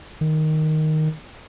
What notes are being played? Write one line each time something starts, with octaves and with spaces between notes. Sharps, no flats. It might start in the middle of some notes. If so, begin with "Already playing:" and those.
D#3